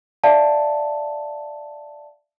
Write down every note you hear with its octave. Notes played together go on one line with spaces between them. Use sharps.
D5 E5 F5 A5